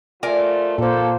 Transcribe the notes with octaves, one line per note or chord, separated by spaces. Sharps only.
F3 A3 F4 A#4 D5 G#5
A#2 F3 A#3 A4 C5